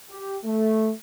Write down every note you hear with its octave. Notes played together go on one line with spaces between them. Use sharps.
G4
A3